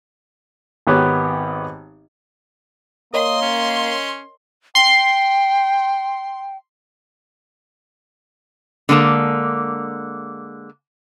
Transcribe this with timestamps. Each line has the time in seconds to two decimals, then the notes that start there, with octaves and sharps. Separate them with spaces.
0.87 G#1 D#3 B3 G4 C#5
3.14 A#3 A#4 C#5 D#5 C6 D#6
3.42 C#4
4.75 G5 C6 C7
8.89 D3 G#3 A#3 A5